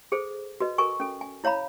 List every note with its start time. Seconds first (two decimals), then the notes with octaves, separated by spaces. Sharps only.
0.12 G#4 A4 C5
0.60 F#4 B4 D#5
0.78 A4 A#4 G#5 C#6
1.00 C#4 A4
1.21 G#5
1.44 E4 C#5 F5 A#5 B5